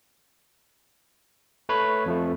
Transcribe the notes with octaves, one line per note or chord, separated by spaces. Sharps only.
A3 B4 C#5 B5
F2 F3 A3